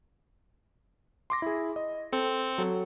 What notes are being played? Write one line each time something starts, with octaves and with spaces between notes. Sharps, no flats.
C6 D6 A#6
E4 G#4
D#5
C4 A4 C#7
F#3 A4